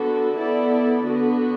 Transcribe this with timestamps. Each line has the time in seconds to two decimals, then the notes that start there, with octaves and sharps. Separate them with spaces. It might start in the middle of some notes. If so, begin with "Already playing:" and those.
Already playing: D3 B3 F#4 A4
0.37 B3 E4 A4 D5
1.06 D3 B3 F#4